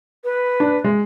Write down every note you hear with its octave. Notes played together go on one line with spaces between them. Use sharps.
B4
D4
G#3